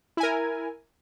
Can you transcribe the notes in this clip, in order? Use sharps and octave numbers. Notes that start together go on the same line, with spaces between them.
E4 A#4 G#5